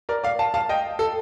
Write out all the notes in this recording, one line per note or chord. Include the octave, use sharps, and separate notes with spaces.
A#4 D5
D5 F5
F5 A5
F5 A5
D#5 G5
A4